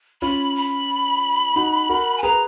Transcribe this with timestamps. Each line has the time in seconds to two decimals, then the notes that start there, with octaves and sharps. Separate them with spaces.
0.22 C#4 F4 B5
0.56 B5
1.56 D#4 F#4
1.89 F#4 A#4
2.18 G#5
2.23 G#4 B4 A#5